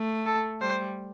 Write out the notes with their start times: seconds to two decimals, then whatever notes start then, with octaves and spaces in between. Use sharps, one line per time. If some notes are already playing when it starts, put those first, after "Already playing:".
Already playing: A3
0.26 A4
0.61 G3 C5